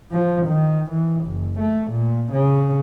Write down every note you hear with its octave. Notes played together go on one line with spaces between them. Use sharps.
F3
D#3
E3
F#1
A3
A#2
C#3